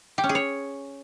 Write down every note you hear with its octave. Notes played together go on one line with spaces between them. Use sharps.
G4
C#4
G#4
C#5